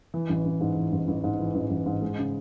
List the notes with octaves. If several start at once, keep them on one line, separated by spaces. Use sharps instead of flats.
E3
A1
A1
G#2
E3
A1
A1
G#2
E3
A1
A1
G#2
G#3
C#3